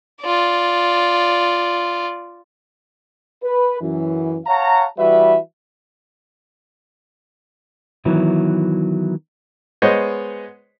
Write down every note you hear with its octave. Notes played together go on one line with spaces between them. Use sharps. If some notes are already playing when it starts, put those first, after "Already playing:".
F4 D5
B4
F#2 E3
C#5 F5 F#5 A5 A#5
E3 G3 F#4 B4 E5
D#3 E3 F#3 B3 E4
G#3 B3 C5 C#5 D#5